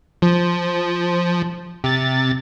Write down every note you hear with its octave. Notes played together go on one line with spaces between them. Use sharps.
F3
C3 A6